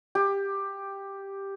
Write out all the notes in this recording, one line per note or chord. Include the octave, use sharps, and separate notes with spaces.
G4